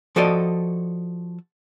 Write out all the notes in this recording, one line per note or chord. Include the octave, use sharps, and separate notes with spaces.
F3 F#4 A4 D5 D#5